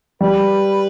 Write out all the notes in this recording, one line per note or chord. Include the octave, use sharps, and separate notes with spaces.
G3 B4